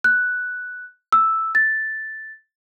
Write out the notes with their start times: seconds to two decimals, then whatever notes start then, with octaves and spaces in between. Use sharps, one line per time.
0.04 F#6
1.13 E6
1.55 A6